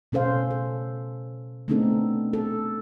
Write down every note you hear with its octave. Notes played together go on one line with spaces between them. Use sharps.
B2 C#4 A4 C5 F5
A4
A3 B3 C4 D4 D#4 A4
A4